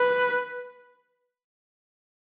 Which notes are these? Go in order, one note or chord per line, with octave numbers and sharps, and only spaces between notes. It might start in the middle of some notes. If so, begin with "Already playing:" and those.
Already playing: B4